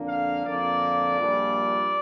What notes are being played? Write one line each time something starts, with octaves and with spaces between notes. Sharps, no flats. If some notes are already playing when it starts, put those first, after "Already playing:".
Already playing: F2 D3 A#3 D4
F5
F2 D3 A#3 D4 D5
A#1 A#2 G3 D4